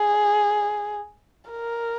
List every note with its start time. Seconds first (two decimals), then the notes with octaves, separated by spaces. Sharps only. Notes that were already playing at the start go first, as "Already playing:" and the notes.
Already playing: G#4
1.50 A#4